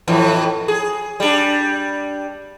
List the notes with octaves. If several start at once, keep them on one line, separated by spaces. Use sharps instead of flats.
F2 A2 E3
G#4
G3 D4